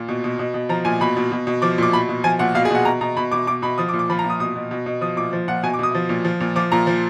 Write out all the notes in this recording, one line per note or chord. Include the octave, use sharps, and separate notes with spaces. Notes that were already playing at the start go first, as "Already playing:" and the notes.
Already playing: A#2
B2
B2
B2
B2
F3 A#5
A#2 G#5
B2 B5
B2
B2
B2
F3 D6
A#2 D6
B2 B5
B2
F3 G#5
A#2 F#5
B2 F5
G#4
B2 F#5
B2 A#5
B2 A#5
B2 B5
B2 D6
B2 D6
B2 B5
F3 D#6
D6
A#2
D6
F3 B5
A#5
A#2
D#6
B2 D#6
B2
B2
B2
F3 D#6
A#2 D6
F3
A#2 F#5
B2 G#5
D6
B2 D#6
F3
A#2
F3
A#2
F3 D6
A#2 A#5
F3